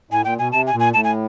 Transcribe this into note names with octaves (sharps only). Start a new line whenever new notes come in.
A2 G#5
A#2 G5
B2 G#5
C3 A5
G#5
A#2
G#5
A2 A5
G#5